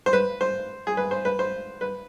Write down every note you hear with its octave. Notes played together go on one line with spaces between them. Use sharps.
C5
B4
C5
G#4
B4
C5
B4
C5
B4